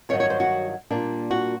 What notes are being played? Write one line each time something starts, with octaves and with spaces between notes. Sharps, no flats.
G2 D#3 F#3 C#5
C#5
C5
F#4
A#2 G3 A#3 D4
F#4